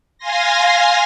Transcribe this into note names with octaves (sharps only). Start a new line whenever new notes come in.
F5 G#5 C6 A#6